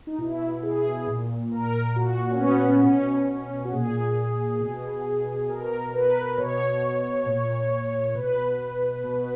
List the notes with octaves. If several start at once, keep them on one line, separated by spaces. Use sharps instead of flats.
D#4
B2 E4
G#4
A#2
A#4
A#2 F#4
C#4
B3
B3
B2 C#4
C#4
F#4
A#2 G#4
B2
B2 A#4
B4
B2 C#5
A#2
C#5
B2 B4
B2